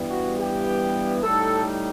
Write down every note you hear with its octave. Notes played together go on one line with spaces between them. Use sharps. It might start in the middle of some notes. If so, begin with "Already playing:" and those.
Already playing: G2 E3 G3 B3
F#4
G4
A2 G3 D#4 A4